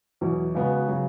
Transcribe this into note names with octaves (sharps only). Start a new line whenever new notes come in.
E2 B2 F#3 E4
C#3 G#3 B3 F#4 B4
C#3 F#3